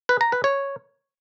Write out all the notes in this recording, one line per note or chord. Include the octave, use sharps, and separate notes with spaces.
B4
A#5
B4
C#5